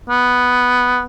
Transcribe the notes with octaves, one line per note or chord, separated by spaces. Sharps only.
B3